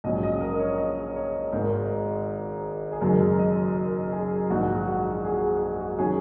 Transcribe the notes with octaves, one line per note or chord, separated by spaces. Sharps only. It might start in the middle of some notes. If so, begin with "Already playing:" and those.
A#1 G#2 F#3 C#4 D#5
D#5
A#4
C#5
D#5
C#5
G#1 G#2 D#3 G#3 A#4
G#4
F#1 F#2 D#3 G#3 A#4
D#5
A#4
G#4
A#1 G#2 D#3 G#3 F#4
F#4
G#4
G#4
G#4
F#4
D#3 F#3 C#4 G#4